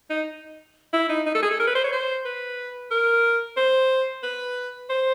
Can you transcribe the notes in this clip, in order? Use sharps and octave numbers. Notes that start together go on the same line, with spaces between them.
D#4
E4
D#4
D#4
A4
G#4
A4
A#4
B4
C5
C#5
C5
B4
A#4
C5
B4
C5